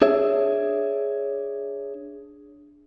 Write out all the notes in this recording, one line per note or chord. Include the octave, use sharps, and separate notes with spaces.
D4 G#4 C#5 E5